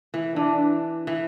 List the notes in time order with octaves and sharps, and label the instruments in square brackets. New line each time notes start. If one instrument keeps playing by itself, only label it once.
[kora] E3
[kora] E3 [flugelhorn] D4
[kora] E3